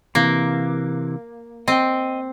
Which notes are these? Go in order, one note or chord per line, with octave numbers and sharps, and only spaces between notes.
C3 E3 A#3
C4 D#5 G5